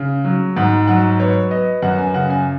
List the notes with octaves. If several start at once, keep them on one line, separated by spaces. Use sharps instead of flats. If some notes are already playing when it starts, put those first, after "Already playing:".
Already playing: C#3
F#3
G#2 F#5
F#3 F#5
B3 C#5
B3 D#5
F#2 F#5
G#5
C#3 F#5
G#5